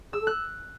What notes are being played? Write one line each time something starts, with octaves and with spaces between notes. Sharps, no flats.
G#4 E6
A4
F#6